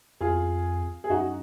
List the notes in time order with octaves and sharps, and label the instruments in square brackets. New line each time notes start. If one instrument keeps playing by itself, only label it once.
[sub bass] F2 [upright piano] F4 G#4
[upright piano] G#4
[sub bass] F#2 [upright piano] D#4 F#4